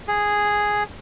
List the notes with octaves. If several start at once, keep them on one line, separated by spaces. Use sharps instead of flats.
G#4